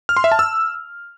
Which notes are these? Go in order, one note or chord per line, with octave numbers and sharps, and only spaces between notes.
F6
C6
E5
A5
E6